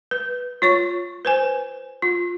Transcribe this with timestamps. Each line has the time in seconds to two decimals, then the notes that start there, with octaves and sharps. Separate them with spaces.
0.11 B4
0.62 F4 C#5 C#6
1.25 B4 C5 G#5
2.02 F4